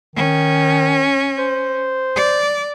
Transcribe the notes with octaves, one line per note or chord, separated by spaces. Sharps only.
D#3 C#4
C5
D5